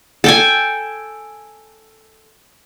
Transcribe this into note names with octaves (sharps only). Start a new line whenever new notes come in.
A4 G5 G#5